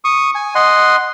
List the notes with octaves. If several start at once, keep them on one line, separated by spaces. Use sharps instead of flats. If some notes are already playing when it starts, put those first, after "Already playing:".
C#6 D#6
G#5
D#5 F#5 C6